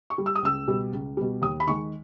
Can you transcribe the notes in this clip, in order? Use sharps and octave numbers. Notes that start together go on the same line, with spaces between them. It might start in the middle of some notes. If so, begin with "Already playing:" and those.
C#6
G3
E6
D#6
C#2 E6
B2 G3
C#2
B2 G3
D#2 D#6
B5
D#3 G#3 C#6